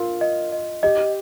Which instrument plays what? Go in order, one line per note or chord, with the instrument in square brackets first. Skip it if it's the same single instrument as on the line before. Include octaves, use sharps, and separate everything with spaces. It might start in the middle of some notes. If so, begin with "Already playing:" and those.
Already playing: [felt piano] F4 [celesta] A#4
[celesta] D#5
D#5
[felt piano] G4 [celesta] D#5